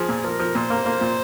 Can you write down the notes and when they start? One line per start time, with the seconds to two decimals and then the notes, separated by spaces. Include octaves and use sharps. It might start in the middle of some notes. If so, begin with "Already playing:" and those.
Already playing: F3 G#4
0.08 A#2
0.24 F3 A#4
0.39 F3
0.55 A#2 C5
0.70 A#3
0.86 A#3
1.01 A#2